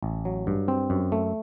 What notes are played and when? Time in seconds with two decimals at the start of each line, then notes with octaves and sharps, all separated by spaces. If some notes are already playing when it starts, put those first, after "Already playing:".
0.03 A1
0.25 F#3
0.47 G2
0.68 C4
0.90 F#2
1.12 A3